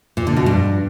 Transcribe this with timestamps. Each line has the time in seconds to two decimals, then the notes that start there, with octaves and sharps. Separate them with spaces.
0.17 A#2
0.27 D3
0.37 B2
0.46 G2